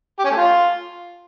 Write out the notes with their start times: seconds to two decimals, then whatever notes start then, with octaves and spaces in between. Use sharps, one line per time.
0.19 G4
0.25 C#4
0.31 A3
0.37 F4